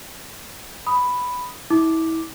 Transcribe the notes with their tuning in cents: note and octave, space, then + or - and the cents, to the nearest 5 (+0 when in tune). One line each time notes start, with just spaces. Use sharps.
B5 +5 D#6 +0
E4 -30 D6 +0